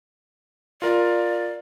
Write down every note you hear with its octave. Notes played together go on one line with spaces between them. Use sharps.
F4 A#4 D5 F5